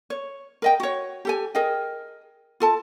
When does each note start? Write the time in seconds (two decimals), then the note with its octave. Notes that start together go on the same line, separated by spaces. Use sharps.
0.10 C#5
0.62 A#4 D#5 G5
0.80 F#4 C#5
1.25 G4 A4 G#5
1.55 G#4 A#4 D#5 G5
2.60 F4 A4 A5